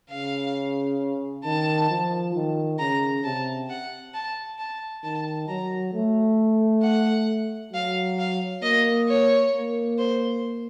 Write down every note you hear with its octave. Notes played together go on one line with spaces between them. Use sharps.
C#3 F5
D#3 A5
F3
D#3
C#3 A#5
C3 A5
F#5
A5
A5
D#3 A5
F#3 A#5
A3
F#5
F#3 F5
F5
A#3 D#5
C#5
A#3
C5